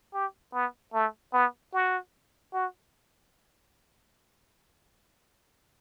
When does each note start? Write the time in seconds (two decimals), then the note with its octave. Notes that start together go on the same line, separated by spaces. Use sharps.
0.14 G4
0.54 B3
0.94 A3
1.33 B3
1.73 F#4
2.54 F#4